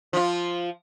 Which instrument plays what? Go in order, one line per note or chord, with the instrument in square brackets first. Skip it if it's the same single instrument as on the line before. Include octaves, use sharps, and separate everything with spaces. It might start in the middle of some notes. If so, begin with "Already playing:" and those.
[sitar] F3 F4